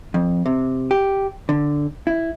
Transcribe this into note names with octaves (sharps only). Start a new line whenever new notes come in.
F2
C3
G4
D3
E4